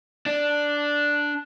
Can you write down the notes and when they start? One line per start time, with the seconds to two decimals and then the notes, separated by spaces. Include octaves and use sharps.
0.26 D4